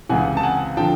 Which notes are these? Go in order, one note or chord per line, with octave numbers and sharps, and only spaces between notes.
C#2 C3 E3 F#5 G#5
A5
F#5 G#5
D3 F3 G5 A5